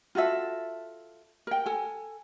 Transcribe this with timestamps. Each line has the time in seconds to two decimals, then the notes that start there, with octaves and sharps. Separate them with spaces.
0.15 F4 F#4 A4 E5
1.47 A#4 G5
1.66 A4 G#5